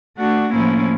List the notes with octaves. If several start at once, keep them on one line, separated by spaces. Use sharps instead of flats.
A3 D4 F#4
A2 F3 A#3 C#4 E4